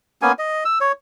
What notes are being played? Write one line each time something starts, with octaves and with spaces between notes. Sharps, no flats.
A#3 B3 C#4 G#5
D#5
E6
C#5